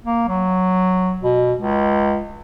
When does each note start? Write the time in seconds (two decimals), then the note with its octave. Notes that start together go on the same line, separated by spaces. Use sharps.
0.05 A#3
0.29 F#3
1.23 B2
1.59 C#2